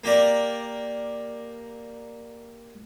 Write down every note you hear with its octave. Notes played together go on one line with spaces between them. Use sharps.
A#3 G4 A#4 D5